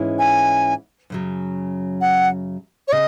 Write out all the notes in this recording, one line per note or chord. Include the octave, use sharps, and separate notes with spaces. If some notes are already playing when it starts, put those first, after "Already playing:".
Already playing: G#2 E3 G#3 C#4 E4
G#5
F#2 C#3 F#3
F#5
C#5
C#3 D#5